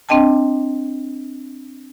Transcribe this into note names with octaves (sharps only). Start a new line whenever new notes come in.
C4 D4 D#5 G5 A5